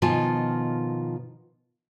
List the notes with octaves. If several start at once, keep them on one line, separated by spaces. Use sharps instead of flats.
B2 D#3 F3 F4 G#5 A5